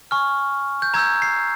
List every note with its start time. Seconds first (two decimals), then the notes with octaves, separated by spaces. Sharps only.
0.11 G#5 C#6 F6
0.82 G6
0.94 A#5 E6 G6 G#6
1.22 C7